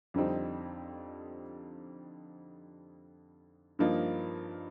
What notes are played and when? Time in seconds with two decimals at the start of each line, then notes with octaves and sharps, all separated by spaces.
0.14 F2 D3 G3 C4 D#4
3.79 G2 F3 A#3 D#4